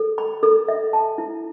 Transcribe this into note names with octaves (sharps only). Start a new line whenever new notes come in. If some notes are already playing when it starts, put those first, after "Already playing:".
Already playing: A4
B5
A4
E5
A5
E4